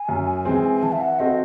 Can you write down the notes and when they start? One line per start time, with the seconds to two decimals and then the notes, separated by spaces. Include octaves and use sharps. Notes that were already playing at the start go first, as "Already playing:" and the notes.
Already playing: G#5
0.09 F#2
0.45 E3 G#3 C4
0.74 G#5
0.83 E3 A5
0.92 E5
1.01 F#5
1.19 C4 F#4 A4 D#5